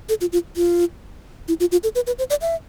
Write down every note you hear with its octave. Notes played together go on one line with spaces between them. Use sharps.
A4
F4
F4
F4
E4
F4
F4
A4
B4
B4
C5
D5
E5